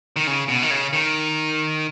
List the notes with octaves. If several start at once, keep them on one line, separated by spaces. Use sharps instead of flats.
D#3
C#3
B2
D#3
C#3
D#3